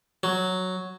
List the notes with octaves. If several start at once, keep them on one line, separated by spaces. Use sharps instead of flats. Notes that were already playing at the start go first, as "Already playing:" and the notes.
F#3